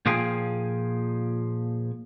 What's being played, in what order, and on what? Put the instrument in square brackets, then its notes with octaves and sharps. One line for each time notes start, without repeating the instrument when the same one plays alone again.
[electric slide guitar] A#2 F3 G#4 F5 G5 G#5